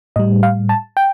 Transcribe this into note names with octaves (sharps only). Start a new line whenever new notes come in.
A2 G3 D#5
F5
A5
G5